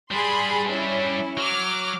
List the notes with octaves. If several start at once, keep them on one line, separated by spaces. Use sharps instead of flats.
G3 D4 G#4 B5 C6
C#4 E4
F#3 D6 F6